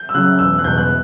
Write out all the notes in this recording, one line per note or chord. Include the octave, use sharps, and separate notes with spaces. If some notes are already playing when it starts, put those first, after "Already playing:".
Already playing: G6
E6
C#3 F#3 F#6
E1 E6
F#6
E2 B2 G6
F#6